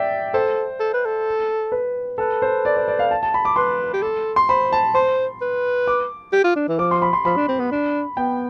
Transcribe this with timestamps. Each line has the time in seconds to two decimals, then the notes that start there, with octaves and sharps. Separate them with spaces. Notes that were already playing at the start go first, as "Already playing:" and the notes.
Already playing: D5 E5 G5
0.34 A4 C5
0.80 A4
0.94 B4
1.05 A4
1.72 B4
2.18 A4 B4
2.42 C5
2.65 D5
2.77 D5
2.88 D5
2.99 F5
3.11 A5
3.23 A5
3.34 B5
3.45 D6
3.56 B4 C6
3.94 G4
4.02 A4
4.36 C6
4.49 C5 B5
4.72 A5
4.94 C5 C6
5.41 B4
5.87 D6
6.33 G4
6.44 F4
6.56 D4
6.68 E3
6.79 F3 D6
6.91 C6
7.02 B5
7.13 C6
7.25 F3 B5
7.36 D4
7.48 C4
7.59 B3
7.71 D4
8.17 B3 G5